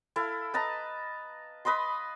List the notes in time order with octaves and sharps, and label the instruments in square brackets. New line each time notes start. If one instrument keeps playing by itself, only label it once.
[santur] E4 A4 F5
B4 D#5 A5 A#5
B4 D#5 B5 C6